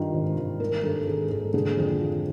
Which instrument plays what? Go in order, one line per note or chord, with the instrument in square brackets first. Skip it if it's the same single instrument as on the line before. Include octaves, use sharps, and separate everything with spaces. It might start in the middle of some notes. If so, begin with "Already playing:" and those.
Already playing: [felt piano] G2 D#3 F4
G#1
G#1
D#3 A#4
G2 A4
G#1 G#4
G#1 A4
D3 G#4
F2
F3